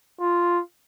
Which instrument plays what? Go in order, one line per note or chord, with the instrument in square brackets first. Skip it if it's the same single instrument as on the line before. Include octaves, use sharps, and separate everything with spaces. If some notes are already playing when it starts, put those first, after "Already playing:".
[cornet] F4